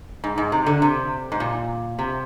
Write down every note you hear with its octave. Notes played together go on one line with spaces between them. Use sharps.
G#2
G#2
C3
D3
C3
G#2
A#2
C3